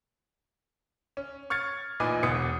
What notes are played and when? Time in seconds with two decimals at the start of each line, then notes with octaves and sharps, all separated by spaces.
1.17 C#4
1.50 C#6 F6 G#6 A6 C#7
2.00 A1 A#2 D#4 B4 G#5 D6
2.23 E1 B2 B4 D#6 C#7